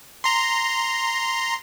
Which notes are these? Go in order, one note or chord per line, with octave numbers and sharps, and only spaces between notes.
A#5 C6